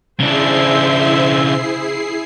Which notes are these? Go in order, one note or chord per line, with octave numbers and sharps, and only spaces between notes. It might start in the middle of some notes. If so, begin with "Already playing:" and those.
C#3 D4 E4 G#4 C5 E5 C7